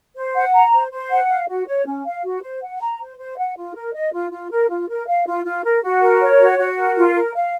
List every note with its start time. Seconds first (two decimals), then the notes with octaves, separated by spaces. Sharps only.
0.16 C5
0.35 F#5
0.54 A#5
0.73 C5
0.92 C5
1.11 F#5
1.29 F5
1.48 F#4
1.67 C#5
1.86 C#4
2.05 F5
2.24 F#4
2.42 C5
2.62 F#5
2.80 A#5
2.99 C5
3.18 C5
3.38 F#5
3.57 F4
3.75 A#4
3.93 D#5
4.13 F4
4.31 F4
4.50 A#4
4.69 F4
4.88 A#4
5.07 F5
5.26 F4
5.44 F4
5.64 A#4
5.83 F#4
6.01 A#4
6.21 C#5
6.40 F#4
6.58 F#4
6.77 A#4
6.96 F4
7.15 A#4
7.34 F5